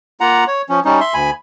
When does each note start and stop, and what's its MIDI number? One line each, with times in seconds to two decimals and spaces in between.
0.21 0.44 58
0.21 0.44 65
0.21 0.44 78
0.21 0.44 82
0.48 0.62 73
0.69 0.80 53
0.69 0.80 61
0.85 1.00 55
0.85 1.00 61
0.85 1.00 63
1.00 1.14 76
1.00 1.14 84
1.14 1.30 38
1.14 1.30 80
1.14 1.30 83